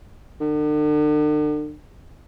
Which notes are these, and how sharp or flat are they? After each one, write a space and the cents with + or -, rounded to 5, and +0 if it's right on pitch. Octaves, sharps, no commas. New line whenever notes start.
D3 +40